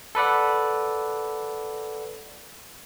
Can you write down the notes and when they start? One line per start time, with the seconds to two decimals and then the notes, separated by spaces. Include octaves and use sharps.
0.15 A4 B4 D5 F#5